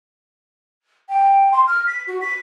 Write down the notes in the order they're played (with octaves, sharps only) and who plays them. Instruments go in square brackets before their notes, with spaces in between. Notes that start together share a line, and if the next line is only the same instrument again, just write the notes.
[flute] G5
C6
F6
B6
F#4
B6